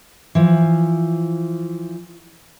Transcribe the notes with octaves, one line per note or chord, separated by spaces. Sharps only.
E3 F3